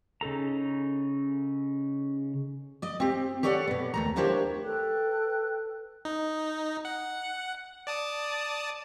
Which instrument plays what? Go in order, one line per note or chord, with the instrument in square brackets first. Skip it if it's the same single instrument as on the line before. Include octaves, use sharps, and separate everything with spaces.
[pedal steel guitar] C#3 D#4 A4 A#5
[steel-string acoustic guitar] D5 D#5
C4 G4
G4 A4 C#5 D5 E5 F#5
B2 B3
D#2 A3 A#5
A#3 D4 E4 G4 C5 C#5
[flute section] A4 B4 G5 F#6
[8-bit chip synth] D#4
F#5
D5 A5 D#6